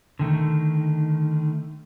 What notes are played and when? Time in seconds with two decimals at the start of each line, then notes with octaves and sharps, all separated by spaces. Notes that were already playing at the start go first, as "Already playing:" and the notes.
0.19 D3 D#3 A3